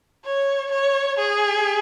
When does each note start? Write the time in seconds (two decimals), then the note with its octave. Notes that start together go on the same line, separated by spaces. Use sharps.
0.25 C#5
0.72 C#5
1.19 G#4